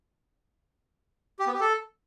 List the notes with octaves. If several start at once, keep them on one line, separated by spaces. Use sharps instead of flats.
G4
B3
G4
A4